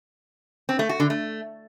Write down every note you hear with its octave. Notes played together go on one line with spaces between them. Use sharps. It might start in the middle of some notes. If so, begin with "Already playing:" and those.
C4
A3
F#4
D3
A3